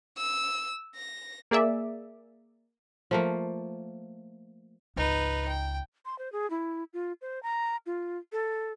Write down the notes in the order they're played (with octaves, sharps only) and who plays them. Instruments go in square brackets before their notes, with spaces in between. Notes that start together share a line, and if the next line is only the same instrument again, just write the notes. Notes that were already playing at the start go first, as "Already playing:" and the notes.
[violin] E6
A#6
[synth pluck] A#3 G#4 D5 E5
[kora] F3 A3 A#3
[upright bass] G#1 C#2 [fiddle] D#4 B4
[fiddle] G5
[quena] C6
C5
G#4
E4
F4
C5
A#5
F4
A4